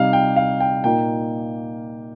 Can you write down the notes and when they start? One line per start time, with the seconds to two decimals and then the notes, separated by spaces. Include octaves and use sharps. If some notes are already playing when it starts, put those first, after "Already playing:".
Already playing: C3 G3 D#4 F5
0.13 G5
0.36 F5
0.60 G5
0.84 A#2 A#3 D#4 G5